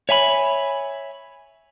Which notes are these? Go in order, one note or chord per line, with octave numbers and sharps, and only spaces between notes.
C#5 E5 G#5 B5